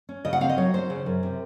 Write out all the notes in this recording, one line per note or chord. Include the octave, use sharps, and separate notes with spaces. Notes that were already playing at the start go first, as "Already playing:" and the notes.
C#4
C#3 D#5
F#5
C4 F5
D#5
F#3 C#5
C#4 C5
C#3
F#2
C3